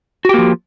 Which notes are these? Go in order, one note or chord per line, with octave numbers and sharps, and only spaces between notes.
F3 A#3 F#4 G4